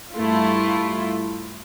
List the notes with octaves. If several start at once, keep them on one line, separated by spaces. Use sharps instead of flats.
G2 A3 E4 F4